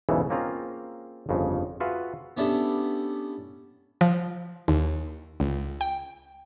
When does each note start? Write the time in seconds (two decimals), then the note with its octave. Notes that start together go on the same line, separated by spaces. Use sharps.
0.09 B1 E2 G#2 C#3 E3 A4
0.30 A#3 C4 C#4 F4 G#4 A#5
1.29 G1 F2 C#3
1.80 F4 F#4 G#4 B4 E5 F5
2.37 B3 C#4 D4 E4 G4 A4
4.01 F3
4.68 D#2
5.40 C#2
5.81 G5